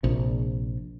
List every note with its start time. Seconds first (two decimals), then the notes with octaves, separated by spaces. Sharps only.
0.03 A#1 C3